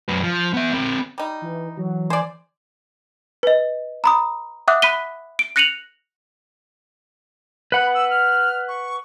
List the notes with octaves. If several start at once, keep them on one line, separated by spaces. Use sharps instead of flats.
F#2 B4
F3
B3 E5
C4 A#4
G3 D#4
E3
E3 F#3
C5 D5 G#5
B4 D#5
A#5 B5 D#6
E5 F#5 D6 D#6 F#6
B5 F#6 B6 D#7 G7
D7
F#6 A#6 C#7 D#7 F7 F#7
B4 F#5 B5
E6
F6
C#6